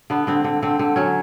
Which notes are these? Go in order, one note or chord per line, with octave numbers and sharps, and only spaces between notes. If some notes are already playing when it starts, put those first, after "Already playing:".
D3 B3
D3 C4
D3
D3 C4
D3
F#3 C#4